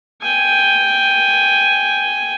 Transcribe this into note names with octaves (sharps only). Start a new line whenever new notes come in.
G5 G#5